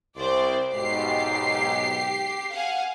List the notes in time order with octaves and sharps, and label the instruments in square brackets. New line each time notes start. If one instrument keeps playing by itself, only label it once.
[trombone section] C2 [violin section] C5 D5
[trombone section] B1 G#2 [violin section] G4 C7
[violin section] F5 F#5 G#5